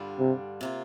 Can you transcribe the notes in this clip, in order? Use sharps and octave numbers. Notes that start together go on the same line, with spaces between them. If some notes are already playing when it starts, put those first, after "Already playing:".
Already playing: G2 D3 G3 D4 F4
C3
C3 A#3 F4